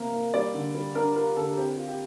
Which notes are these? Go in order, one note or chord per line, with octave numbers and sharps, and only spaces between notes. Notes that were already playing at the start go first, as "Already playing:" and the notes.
Already playing: C3 F3 A#3 E4 A#4
A#3
G3 D5
D3
G3
D4 A#4
F4 A#4
D3 A4
C4 G4
F4
G4